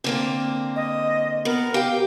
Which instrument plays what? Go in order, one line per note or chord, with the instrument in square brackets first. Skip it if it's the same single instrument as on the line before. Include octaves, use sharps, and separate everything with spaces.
[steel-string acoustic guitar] D3 A#3 C4
[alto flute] D#5
[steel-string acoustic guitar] B3 [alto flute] A#4
[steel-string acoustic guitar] G4 G5 [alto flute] F5